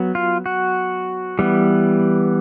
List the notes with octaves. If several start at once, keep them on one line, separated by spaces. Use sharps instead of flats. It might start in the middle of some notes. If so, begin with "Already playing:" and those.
Already playing: F#3 B3
F4
F#4
E3 G3 B3